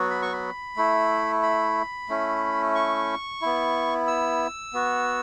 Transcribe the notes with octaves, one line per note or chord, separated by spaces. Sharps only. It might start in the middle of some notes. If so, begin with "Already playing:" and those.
Already playing: F#3 B3 F#4
B5
C#6
B5
A3 E4
B5
A3 C#4 E4
C#6
B3 E4
E6
B3 F#4